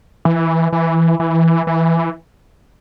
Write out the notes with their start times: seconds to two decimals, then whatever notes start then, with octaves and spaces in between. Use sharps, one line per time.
0.25 E3
0.72 E3
1.20 E3
1.67 E3